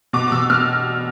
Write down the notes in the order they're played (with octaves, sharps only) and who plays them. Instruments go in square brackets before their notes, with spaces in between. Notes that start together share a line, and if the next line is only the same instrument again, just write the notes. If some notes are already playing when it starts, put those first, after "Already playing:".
[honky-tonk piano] B2 D6
D6
B2 E6
B2 F6